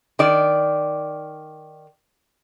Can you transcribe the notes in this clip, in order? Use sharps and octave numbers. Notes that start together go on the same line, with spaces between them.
D#3 D5